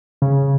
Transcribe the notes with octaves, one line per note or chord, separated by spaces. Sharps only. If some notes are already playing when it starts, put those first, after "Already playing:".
C#3